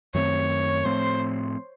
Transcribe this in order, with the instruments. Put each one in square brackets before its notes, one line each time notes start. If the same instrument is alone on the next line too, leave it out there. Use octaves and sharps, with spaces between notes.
[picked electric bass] F#2 D#3 A3 C4 [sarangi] C#5
[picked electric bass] A2 F3 A3 C4 [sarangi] C5